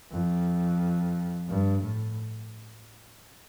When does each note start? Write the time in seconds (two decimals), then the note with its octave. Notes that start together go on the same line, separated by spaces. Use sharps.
0.11 F2
1.47 G2
1.81 A2